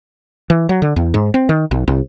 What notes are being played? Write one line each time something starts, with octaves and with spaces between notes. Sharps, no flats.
E3
F#3
D3
E2
G#2
C4
D#3
B1
C2